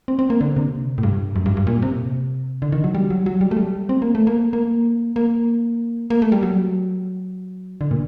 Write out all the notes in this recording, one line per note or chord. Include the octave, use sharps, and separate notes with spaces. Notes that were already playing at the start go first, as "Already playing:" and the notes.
C4
C4
A#3
D3
C3
A2
G2
F#2
G2
G2
A#2
C3
D3
D#3
F#3
G3
F#3
F#3
G3
A3
G3
C4
A#3
A3
A#3
A#3
A#3
A#3
A3
G3
F#3
D3
A#2